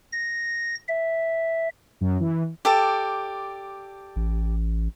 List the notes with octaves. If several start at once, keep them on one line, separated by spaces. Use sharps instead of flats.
A#6
E5
F#2
E3
G4 A4 D5
A1